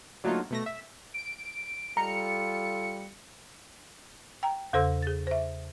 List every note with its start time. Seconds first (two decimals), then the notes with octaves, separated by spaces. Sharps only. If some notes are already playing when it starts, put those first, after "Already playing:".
0.24 D3 F#3 A3 A#3 D#4 F4
0.50 B2 A3 A#6
0.66 E5
1.14 D7
1.97 G3 F4 A4 A#5 C#7
4.43 G5 A#5
4.73 E2 C#3 A4 C5 C6 E6
5.02 G#4 A6
5.27 C5 E5